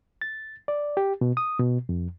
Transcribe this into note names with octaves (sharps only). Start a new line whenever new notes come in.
A6
D5
G4
B2
D#6
B2
F2